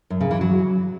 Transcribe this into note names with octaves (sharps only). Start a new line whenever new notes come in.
F#2
C#3
E3
F#3